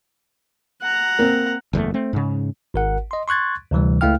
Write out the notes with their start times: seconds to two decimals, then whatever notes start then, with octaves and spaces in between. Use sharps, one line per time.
0.82 F#5 A#5
1.19 A#3 C4
1.73 F#1 E2 A2 A3
1.94 A3 C4
2.13 G#2 C#3
2.74 G#1 A#4 F#5
3.11 D#5 C6
3.28 C6 C#6 F#6 G#6 A6
3.71 D2 C3 E3 G3
4.01 C#2 A3 E4 F5 G5 F6